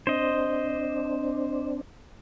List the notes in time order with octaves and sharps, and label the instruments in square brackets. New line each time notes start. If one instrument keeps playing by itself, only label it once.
[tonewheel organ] C4 D4 [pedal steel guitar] C5 D#5